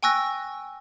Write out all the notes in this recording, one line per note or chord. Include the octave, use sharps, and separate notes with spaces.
G5 G#5 C#6 E6 F#6 A#6